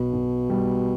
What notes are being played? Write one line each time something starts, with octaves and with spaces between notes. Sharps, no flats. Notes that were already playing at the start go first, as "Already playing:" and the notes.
Already playing: B1 B2
B1
G3